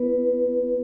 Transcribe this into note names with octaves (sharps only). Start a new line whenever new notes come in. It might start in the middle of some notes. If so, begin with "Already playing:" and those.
Already playing: B3 E4 B4